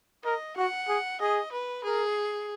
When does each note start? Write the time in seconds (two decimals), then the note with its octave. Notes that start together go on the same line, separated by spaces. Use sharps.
0.24 A#4 D#5
0.57 F#4 F#5
0.88 G#4
1.21 G#4 D#5
1.52 B4
1.84 G#4 A#4